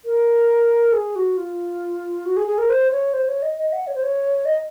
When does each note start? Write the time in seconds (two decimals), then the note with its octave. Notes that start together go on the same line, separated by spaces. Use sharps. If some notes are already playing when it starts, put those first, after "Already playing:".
0.05 A#4
0.93 G#4
1.16 F#4
1.37 F4
2.25 F#4
2.37 G#4
2.47 G#4
2.58 A#4
2.69 C5
2.91 C#5
3.13 C5
3.28 C#5
3.42 D#5
3.58 D#5
3.73 F#5
3.87 C#5
3.95 C5
4.03 C#5
4.45 D#5